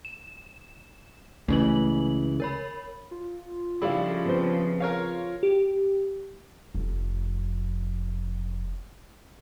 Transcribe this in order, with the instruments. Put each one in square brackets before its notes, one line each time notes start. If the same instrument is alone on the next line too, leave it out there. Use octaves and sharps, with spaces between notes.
[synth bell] E7
[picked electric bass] C#2 C#3 E3 [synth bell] A3 F#7
[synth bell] A#4 C#5 B5
[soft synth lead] F4
[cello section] C#3 F3 [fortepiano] G3 D4 E4 [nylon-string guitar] A4 D5 F5
[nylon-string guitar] B3 C4 C5
[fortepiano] A#4 C#5 F5
[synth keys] G4
[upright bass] F1 F2